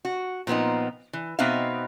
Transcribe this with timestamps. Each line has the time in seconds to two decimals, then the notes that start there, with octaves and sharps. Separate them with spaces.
0.05 F#4
0.47 A#2 F3 B3 C4 D#4
1.13 E3
1.39 B2 B3 C4 D#4 E5 F5